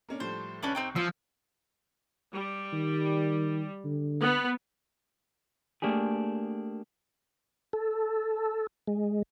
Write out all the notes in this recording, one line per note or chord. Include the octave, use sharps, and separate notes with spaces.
A#3 C#4 D4
A2 F3 G3 C5
C2 C#4 D4 B4 C#6 F#7
C4 D#4 G4
F3 E6
G3
D#3
D3
B3
A3 A#3 D4 G4 G#4
A4
G#3